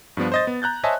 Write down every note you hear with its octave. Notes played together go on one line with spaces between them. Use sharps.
G2 F3 B3 D4
C5 D#5 A6
B3
A#5 F#6 G6 A6
C5 C#5 D#5 E5 G#5 A5